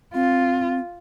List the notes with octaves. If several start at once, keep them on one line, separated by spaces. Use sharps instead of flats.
C4 F4